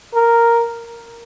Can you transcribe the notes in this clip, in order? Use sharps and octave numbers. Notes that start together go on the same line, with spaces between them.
A#4